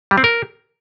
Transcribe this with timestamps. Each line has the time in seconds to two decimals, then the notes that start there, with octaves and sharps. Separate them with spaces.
0.11 G3
0.18 C4
0.24 A#4